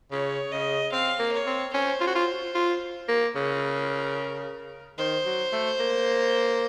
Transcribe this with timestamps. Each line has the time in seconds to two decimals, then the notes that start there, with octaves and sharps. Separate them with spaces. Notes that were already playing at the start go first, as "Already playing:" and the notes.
0.11 C#3 C#5
0.51 C#3 D#5
0.92 C4 F5
1.19 A#3
1.32 C#5
1.46 C4
1.73 C#4 C5
2.01 F4
2.07 F#4
2.15 F4
2.55 F4
3.09 A#3
3.35 C#3 A#4
4.98 D#3 C5
5.26 F#3
5.52 A3
5.80 A#3